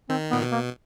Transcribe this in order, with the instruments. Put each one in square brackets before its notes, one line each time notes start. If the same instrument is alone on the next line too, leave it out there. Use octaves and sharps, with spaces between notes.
[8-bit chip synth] D#3 [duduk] C4
[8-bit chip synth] A#2 [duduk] B3
[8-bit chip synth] B2
[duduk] A#3